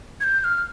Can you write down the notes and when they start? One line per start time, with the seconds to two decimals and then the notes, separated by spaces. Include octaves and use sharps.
0.20 G#6
0.24 G6
0.41 G6
0.44 F6